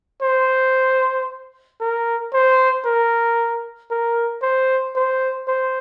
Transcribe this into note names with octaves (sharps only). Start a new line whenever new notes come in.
C5
A#4
C5
A#4
A#4
C5
C5
C5